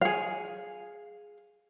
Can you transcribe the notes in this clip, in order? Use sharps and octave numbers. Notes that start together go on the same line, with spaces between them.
G#4 F5